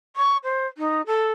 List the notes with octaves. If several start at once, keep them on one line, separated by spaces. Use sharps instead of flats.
C#6
C5
D#4
A4